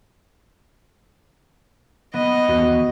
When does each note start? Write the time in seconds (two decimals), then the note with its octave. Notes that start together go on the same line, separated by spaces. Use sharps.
2.14 B3 D#5
2.49 D#2 E3 B3 F#4